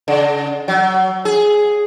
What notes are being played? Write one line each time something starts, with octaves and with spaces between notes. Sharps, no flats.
C#3
F#3
G#4